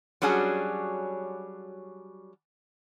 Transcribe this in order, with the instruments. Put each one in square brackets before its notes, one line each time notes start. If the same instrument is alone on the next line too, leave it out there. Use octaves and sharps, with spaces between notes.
[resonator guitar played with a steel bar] F#3 G3 C#4 D4 F#4 G#4